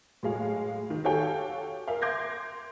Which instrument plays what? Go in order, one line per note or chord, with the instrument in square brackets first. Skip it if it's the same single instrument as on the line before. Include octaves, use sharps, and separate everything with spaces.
[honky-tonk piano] A2 F#3 G#3 F5
D#3
F#4 G4 A4 C#5 F5 G5
A#4 E5 F5
C6 D6 G6 G#6 A#6